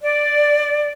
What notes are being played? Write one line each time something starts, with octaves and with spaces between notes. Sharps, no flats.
D5